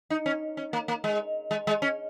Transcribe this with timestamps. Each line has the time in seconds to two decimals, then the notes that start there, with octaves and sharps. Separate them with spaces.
0.10 D#4
0.26 C#4
0.57 C#4
0.73 A#3
0.88 A#3
1.04 G#3
1.51 G#3
1.67 G#3
1.82 C#4